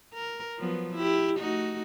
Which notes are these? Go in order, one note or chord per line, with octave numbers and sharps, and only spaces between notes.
A#4
F3 F#3 B3
E4 G4
A3 D#4 F#4